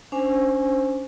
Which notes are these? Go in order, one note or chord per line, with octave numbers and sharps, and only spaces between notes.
C#4 D4 C5 G#5